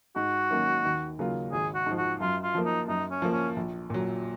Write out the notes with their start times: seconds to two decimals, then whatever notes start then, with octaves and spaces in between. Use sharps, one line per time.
0.16 G#2 F#4
0.50 D#3 F#3 A#3 C#4
0.85 D#2
1.19 C#3 F#3 A#3 F4
1.52 G#1 G#4
1.75 F#4
1.86 G#2 F3
1.98 F#4
2.20 F#2 F4
2.43 F4
2.55 F3 A#3
2.66 D#4
2.88 F#2 D#4
3.11 C#4
3.22 F3 A#3
3.33 C#4
3.56 A#1
3.90 A#2 F#3